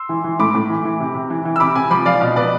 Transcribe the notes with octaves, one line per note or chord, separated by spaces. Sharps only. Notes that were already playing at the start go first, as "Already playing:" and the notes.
Already playing: C6 E6
E3
E3
A2 B5 D6
A2
E3
E3
C3
C3
E3
E3
E6
C3 B5 D6
C3 G#5 B5
F3 B5 D6
F3 D5 F5
B2
B2 B4 D5